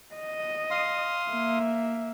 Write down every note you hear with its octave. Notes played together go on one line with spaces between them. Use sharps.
D#5
F5 C6 D#6
A#3 E5